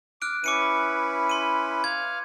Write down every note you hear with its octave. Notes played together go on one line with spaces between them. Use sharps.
D6 F6 F#6 D7
C#4 E4 B4 D6 C#7 D#7
C6 D#7
F5 G#6